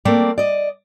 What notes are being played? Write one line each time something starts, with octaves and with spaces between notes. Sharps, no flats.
A3 A#3 C4 D5
D5 D#5